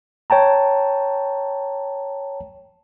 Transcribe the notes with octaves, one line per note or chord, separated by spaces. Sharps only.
C#5 G5 A5 A#5